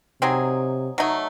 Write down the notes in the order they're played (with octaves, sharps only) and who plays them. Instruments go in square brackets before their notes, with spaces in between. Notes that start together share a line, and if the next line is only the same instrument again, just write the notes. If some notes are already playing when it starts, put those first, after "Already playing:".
[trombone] C3 [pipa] F#3 C4 D#4 G#4
[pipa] F#3 A3 D#4